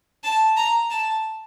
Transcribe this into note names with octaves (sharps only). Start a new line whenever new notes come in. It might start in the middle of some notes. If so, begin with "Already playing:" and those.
A5
A#5
A5